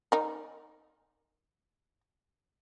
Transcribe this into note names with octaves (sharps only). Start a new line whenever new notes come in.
D#4 A#4